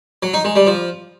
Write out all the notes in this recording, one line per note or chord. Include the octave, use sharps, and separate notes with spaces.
F#3
D#4
G#3
G3
F3